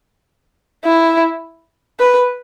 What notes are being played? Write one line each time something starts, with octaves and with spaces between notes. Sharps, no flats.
E4
B4